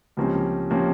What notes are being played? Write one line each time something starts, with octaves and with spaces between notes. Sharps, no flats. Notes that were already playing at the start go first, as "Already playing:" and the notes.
C#2 C3 F3 A#3 C#4
C3 F3 A#3 C#4